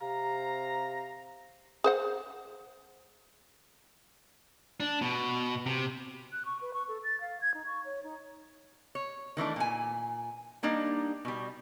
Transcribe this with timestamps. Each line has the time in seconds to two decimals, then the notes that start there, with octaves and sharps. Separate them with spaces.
0.01 C3 F5 A#5
1.84 G#4 C5 F#5
4.80 D4
5.01 B2
5.66 C3
6.32 F#6
6.45 C#6
6.61 B4
6.74 C#6
6.88 A4
7.04 A6
7.21 F5
7.42 G#6
7.54 D#4
7.66 C#6
7.85 C#5
8.04 D#4
8.95 C#5
9.37 D#3 E3 A3 D4
9.56 A#2 G#5
10.63 G3 A#3 D4 D#4
11.25 B2 G3